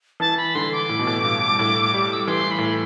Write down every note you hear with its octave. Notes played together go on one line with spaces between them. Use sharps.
E3 A5
B5
D3 C6
D6
A2
B2
A2
G2
A2
G3
E6
D6
E3 C6
B5
A2